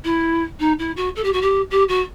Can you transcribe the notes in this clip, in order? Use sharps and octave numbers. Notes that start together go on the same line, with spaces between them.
E4
D#4
E4
F#4
A4
G4
F#4
G4
G4
F#4